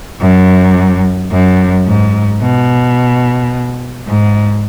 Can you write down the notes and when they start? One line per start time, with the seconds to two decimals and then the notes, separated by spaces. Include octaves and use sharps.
0.21 F#2
1.32 F#2
1.86 G#2
2.42 B2
4.07 G#2